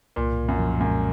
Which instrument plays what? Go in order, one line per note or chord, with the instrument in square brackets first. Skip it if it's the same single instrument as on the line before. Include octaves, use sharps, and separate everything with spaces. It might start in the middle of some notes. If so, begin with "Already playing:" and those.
[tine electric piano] C2 [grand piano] A#2
[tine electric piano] A#2
[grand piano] F#2
[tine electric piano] F3
[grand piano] F#2 [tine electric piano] G#3